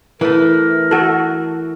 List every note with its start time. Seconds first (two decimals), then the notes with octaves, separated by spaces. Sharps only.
0.21 E3 A3 A#4
0.91 F#4 A4